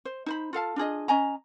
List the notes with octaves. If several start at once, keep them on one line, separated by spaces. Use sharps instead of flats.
C5
D#4 C5 B5
F4 A4 F5 A5
D4 F4 G#4 D#5
C#4 D#5 G#5 A#5